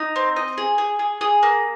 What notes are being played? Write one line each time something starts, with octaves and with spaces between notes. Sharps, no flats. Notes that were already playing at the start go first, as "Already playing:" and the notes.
Already playing: D#4
C4
D#5
G#4
G#4
G#4
G#4
A#3